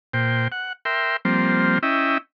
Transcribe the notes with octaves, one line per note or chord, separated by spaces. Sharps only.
A#2 C5 G5
F#5
A#4 E5 G5 C6
F3 G3 A#3 C4 C5
C#4 E4 D#5 E5 G5